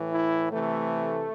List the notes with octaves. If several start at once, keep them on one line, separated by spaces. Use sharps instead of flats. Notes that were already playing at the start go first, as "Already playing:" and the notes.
Already playing: A2 E3
E4
C3 E3 A3